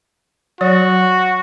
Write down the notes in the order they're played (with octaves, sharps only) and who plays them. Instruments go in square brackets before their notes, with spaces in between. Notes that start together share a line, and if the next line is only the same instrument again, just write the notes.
[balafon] F#3 C#5 [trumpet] F#4